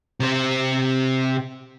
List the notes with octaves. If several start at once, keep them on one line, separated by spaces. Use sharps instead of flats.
C3 C5